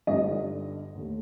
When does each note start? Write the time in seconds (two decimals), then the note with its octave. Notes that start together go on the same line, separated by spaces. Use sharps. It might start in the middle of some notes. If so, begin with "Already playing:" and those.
0.07 G1 G2 D3 G3 D#5
0.95 D#2 D#3 A3